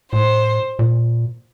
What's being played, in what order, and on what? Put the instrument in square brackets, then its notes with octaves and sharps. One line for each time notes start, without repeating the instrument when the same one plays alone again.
[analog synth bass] A2 [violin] C5
[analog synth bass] A#2